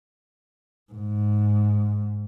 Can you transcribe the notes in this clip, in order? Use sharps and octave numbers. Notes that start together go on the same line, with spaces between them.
G#2